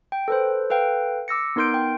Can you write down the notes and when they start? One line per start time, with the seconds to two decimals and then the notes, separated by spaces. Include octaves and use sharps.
0.12 G5
0.28 A4 B4 C5
0.70 A4 B4 F5 G5
1.28 D6 E6 A#6 C#7
1.56 B3 D#4 A#4 C6 G6 D7
1.74 G5